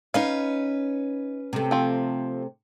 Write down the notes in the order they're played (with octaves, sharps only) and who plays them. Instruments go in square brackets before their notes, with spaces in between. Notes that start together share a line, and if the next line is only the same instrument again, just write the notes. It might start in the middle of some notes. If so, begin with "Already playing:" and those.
[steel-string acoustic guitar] C#4 B4 [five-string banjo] D#4 F5
[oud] C3 A3
[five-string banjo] F3 C4